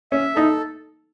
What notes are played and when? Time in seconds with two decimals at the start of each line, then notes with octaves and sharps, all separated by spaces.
0.12 C#4 E5
0.35 D#4 A4